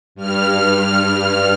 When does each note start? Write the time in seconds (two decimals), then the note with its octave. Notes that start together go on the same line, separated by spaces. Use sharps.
0.15 G2 F6